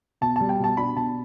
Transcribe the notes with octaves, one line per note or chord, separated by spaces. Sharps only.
B2 A5
G3 A5
G5
B2 A5
D4 B5
B2 A5